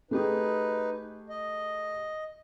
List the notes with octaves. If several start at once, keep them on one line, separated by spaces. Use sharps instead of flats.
A3 D#4 G4 G#4 B4
D#5